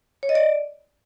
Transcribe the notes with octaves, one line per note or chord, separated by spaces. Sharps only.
C#5
D#5
D5